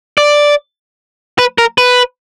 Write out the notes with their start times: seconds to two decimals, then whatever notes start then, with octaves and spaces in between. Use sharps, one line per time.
0.18 D5
1.39 B4
1.58 A#4
1.78 B4